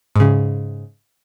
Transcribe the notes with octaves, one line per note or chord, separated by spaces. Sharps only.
G#2 C#3